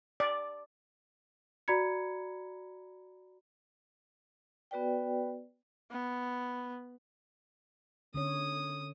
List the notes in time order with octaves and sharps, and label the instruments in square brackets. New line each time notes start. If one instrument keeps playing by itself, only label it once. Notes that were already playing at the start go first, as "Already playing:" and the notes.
[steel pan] D5
[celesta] F#4 D5 A#5 B5 G#6 C#7
[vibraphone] B3 F#4 B4 D5 G5
[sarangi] B3
[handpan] D3 C#4 C#5 [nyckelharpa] D#6